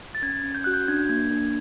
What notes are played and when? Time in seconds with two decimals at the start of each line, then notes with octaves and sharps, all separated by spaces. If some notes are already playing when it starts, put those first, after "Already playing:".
0.15 A6
0.22 C#4 G#6
0.44 C#4
0.55 G6
0.64 F#4 F#6
0.74 G6
0.88 D4 G#6
0.99 G6
1.09 A#3 G#6
1.31 D4